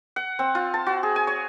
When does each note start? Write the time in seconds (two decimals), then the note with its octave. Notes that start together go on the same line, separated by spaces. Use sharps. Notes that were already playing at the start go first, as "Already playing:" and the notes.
0.16 F#5
0.39 C4
0.55 F4
0.74 A5
0.87 F#4
1.03 G#4
1.16 G#5
1.27 C#5